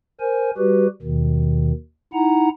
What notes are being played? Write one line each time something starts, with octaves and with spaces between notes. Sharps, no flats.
A#4 C5 G#5
G3 F#4 G4 B4
D#2 B2 D#3
D#4 E4 F#5 A#5